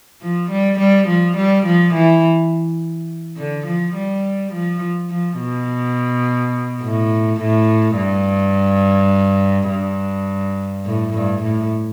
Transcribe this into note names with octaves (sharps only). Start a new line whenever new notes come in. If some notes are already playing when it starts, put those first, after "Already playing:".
F3
G3
G3
F3
G3
F3
E3
D3
F3
G3
F3
F3
B2
A2
A2
G2
G2
A2
G2
A2